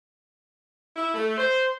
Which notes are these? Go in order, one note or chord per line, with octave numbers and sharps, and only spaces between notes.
E4
A3
C5